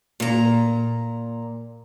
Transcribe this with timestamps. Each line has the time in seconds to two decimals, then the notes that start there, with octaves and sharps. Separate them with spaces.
0.20 A#2 A#5